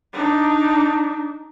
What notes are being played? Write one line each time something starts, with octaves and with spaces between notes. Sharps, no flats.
D4 D#4